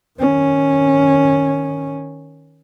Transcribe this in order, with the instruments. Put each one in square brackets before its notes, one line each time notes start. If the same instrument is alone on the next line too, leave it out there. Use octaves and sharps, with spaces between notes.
[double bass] D#3 C#4